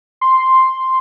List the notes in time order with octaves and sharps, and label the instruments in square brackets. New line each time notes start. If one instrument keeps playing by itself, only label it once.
[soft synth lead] C6